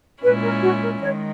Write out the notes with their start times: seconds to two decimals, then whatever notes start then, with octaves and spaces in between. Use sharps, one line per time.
0.22 A#2 G#3 C#4 E4 B4
0.43 A#4
0.62 F#4
0.82 A#4
1.02 D#3 G#3 C#5